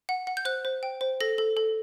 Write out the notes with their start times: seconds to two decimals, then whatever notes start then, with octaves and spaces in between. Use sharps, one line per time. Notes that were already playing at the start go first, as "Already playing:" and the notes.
0.09 F#5
0.27 F#5
0.37 G6
0.45 C5 F#6
0.65 C5
0.83 G5
1.01 C5
1.21 A4 A#6
1.38 A4
1.57 A4